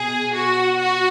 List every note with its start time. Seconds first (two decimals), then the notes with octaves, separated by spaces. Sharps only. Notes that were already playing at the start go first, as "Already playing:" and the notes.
Already playing: B2 G#4
0.34 F#4
0.79 F#4